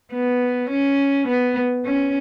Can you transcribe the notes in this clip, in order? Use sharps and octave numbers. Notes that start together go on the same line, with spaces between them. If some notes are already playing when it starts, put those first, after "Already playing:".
B3
C#4
B3
C#4